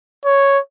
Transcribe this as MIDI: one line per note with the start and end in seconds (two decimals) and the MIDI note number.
0.25 0.59 73